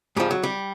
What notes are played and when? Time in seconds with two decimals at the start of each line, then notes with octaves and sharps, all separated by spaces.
0.16 G#2 F3 G3
0.31 F#3
0.43 G3